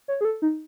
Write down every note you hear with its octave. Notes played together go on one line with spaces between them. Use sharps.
C#5
G#4
A4
D#4